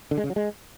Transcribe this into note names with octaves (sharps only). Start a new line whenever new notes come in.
D3
G#3
C#3
F#3
G#3